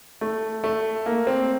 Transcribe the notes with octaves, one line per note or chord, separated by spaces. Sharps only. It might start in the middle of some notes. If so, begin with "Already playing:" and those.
A3
A3
A#3
C4